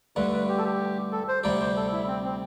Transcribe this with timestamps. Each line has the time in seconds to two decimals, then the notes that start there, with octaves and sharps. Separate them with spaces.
0.16 G2 D3 A3 B4
0.32 B4
0.48 G4
0.58 A4
0.64 G4
1.12 A4
1.28 C5
1.44 D2 C3 G3 D4 G4 D5
1.60 C5
1.76 A4
1.93 E4
2.08 C4
2.24 C4